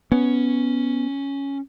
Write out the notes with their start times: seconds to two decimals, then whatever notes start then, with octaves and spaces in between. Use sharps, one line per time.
0.12 B3 C#4